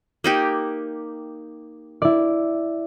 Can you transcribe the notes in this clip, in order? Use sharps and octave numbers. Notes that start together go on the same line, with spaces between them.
A#3 D#4 G4
E4 D5